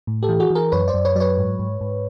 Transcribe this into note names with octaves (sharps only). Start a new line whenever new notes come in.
A2
G4 A4
E3
F#4 G#4
E3
G#4 A#4
F#2 B4 C#5
C5 D5
F#2
B4 C#5
F#3 B4 C#5 D5
G#2
G#2
G#2